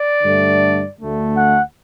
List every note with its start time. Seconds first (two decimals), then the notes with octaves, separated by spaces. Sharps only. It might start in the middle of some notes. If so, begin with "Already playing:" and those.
Already playing: D5
0.22 G2 D3 A3
0.99 D2 D3 A3
1.36 F#5